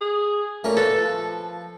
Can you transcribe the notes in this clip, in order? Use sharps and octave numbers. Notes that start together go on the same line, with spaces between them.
G#4
A#2 A3 C#4 A#4
A4 B4
F3